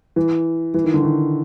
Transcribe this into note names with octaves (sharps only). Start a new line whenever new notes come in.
E3
E3
D#3
D3
D#3